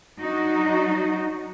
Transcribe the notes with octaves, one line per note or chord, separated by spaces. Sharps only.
F#3 D4 D#4 F#4